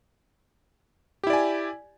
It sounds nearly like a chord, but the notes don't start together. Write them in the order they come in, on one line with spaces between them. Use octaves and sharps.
G4 E4 D5 G#5